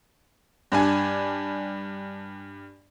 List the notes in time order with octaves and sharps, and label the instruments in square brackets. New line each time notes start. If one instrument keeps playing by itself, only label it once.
[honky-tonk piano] G2 D4 G#5